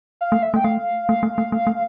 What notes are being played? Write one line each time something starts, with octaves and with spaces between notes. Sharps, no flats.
F5
A3
E5
A3
G5
A3 F5
A3
A3
A3
A3
A3